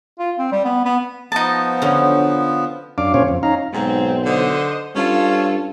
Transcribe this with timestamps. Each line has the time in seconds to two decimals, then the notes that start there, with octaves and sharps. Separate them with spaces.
0.19 F4
0.39 C4
0.52 G3
0.65 B3
0.85 B3
1.32 F3 B3 D#4 A5
1.82 D3 F#3 C#4
2.98 F#2 D4 F5 D6
3.14 A#2 C#3 C#4 C5 C#5 F5
3.28 F2
3.43 C#4 D#4 F5 A#5
3.74 B1 G#2 C4
4.25 D3 C5 D#5
4.95 G2 C#4 F4 A4